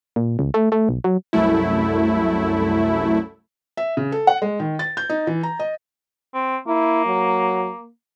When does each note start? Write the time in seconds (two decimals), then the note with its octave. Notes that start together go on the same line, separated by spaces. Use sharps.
0.16 A#2
0.39 C#2
0.54 A3
0.72 A3
0.89 B1
1.04 F#3
1.33 C2 F#2 A3 E4
3.77 E5
3.97 C#3
4.12 A4
4.27 F#5
4.42 G#3
4.60 D#3
4.79 A6
4.97 G6
5.09 D#4
5.27 E3
5.43 A#5
5.60 D#5
6.34 C4
6.67 A#3 E4
7.06 F#3